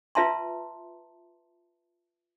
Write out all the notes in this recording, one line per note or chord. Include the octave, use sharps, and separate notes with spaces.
F4 B4 E5 A5 A#5 C6